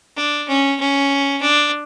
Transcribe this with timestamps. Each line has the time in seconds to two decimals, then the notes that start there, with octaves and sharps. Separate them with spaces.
0.16 D4
0.48 C#4
0.80 C#4
1.42 D4